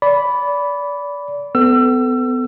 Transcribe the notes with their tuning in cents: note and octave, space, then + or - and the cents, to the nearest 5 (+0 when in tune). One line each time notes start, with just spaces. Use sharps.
D5 -25 B5 +0
B3 +35 A4 +0 E6 +30